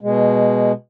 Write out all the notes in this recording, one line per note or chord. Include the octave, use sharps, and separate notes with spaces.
B2 G#3